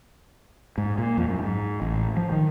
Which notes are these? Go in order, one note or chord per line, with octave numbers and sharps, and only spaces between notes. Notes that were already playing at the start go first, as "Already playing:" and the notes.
G#2
A#2
F2
F#2
G#2
A1
F3
D#3